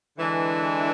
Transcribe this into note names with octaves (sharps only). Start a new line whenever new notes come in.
D3 E3 G#3 D4